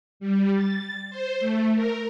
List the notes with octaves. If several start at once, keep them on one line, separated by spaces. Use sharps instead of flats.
G3
A6
C5
A3
A#4